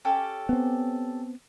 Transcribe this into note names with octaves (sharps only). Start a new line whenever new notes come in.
C#4 G4 A4
B3 C4